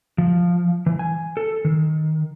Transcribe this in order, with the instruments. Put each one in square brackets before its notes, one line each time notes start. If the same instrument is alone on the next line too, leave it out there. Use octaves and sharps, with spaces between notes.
[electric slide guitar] F3
E3
G#5
A4
D#3